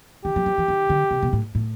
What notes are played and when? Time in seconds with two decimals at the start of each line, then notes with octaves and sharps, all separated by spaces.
0.25 D#3 G4
0.36 F#3
0.46 F3
0.58 E3
0.68 D#3
0.90 D3
1.11 C3
1.23 B2
1.33 A2
1.55 A2